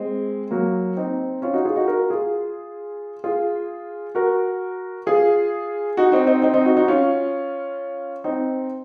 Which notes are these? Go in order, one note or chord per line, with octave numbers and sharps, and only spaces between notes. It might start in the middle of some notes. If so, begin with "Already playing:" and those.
Already playing: G#3 C4
F#3 A#3
C4 D#4
C#4 F4
D#4 F#4
F4 G#4
D#4 F#4
F#4 A#4
F4 G#4
F4 G#4
F#4 A#4
F4 G#4
D#4 F#4
C4 D#4
C4 D#4
C4 D#4
C4 D#4
D#4 F#4
D#4 F#4
C#4 F4
C4 D#4